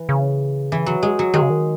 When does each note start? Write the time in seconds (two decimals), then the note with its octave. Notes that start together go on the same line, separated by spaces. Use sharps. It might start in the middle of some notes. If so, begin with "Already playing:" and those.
Already playing: E3
0.09 C#3
0.72 E3
0.86 F#3
1.03 G#3
1.19 F#3
1.34 D#3 G#3
1.42 C#3
1.50 D#3